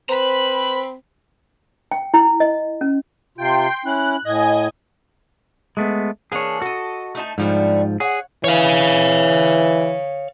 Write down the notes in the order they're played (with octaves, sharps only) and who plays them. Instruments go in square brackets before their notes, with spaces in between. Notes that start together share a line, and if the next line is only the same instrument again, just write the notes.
[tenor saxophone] C4 [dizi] B4 [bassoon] C5 [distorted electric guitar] A#5 B5
[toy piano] G5
E4
D#5
C#4
[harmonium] C3 F4 [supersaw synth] G5 C6
[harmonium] C#4 E4 [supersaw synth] F#6
[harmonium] A2 [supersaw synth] D#5 G#5
[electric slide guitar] G#3 A3 B3
[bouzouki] E3 A#3 D4 [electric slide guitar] G#4 C#5
[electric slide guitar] F#4 [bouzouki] A4 D#5
[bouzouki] A3 D#4 A5
[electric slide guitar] G#2 F3 [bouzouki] D3 G3 A3
[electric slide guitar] G#4 [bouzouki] C#5 F#5
[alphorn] E3 [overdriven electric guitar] C#5 F5